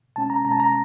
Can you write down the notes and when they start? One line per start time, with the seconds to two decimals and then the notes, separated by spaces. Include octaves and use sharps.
0.16 B2 G#3 C#4 A5
0.30 A#5
0.45 B2 G#3 C#4 A#5
0.52 A5
0.60 A#5